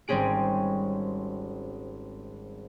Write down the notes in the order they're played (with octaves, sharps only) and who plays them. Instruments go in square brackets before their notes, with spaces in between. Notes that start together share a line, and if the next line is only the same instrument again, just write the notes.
[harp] G#1 G3 C4 C#4 G#4 D7